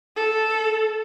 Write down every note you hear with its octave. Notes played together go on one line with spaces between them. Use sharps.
A4